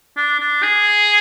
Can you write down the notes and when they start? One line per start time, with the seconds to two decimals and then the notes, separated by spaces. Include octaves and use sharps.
0.16 D4
0.39 D4
0.62 G#4